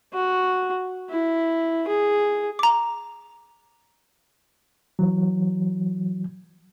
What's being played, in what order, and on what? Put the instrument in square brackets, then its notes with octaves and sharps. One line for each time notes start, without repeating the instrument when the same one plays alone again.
[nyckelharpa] F#4
E4
G#4
[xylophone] A#5 D6
[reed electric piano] E3 F#3